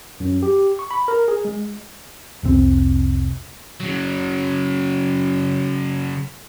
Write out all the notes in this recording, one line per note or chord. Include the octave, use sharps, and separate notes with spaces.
F#2
G4
C#6
B5
A#4
G#4
G#3
F1 C2 C4
C#3 F#3